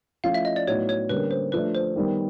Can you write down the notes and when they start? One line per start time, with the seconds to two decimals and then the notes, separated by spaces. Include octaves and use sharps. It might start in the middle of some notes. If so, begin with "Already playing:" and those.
0.24 F3 A3 C#4 E4 F5
0.34 E5
0.45 D#5
0.56 D5
0.67 A2 F#3 B3 D#4 F#4 C#5
0.89 C#5
1.09 D3 G3 A#3 C#4 B4
1.31 C5
1.52 F3 A3 D4 B4
1.75 C5
1.96 D#3 G3 B3